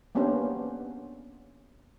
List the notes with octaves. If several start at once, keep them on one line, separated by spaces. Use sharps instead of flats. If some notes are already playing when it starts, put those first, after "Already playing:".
A#3 B3 C#4 D4 G4 C5